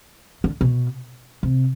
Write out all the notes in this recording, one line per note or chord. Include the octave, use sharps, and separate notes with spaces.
D3
B2
C3